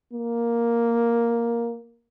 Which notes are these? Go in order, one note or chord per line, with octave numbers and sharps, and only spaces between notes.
A#3